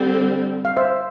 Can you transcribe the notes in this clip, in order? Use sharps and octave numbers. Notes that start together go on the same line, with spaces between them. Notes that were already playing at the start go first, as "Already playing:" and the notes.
Already playing: D3 G3 C4
F5
C5 E5